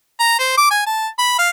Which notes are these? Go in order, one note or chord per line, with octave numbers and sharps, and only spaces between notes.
A#5
C5
D6
G#5
A5
B5
F5